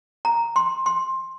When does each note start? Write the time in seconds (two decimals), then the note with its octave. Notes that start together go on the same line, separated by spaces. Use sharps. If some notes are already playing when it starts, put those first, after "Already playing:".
0.25 A#5
0.56 C6
0.86 C6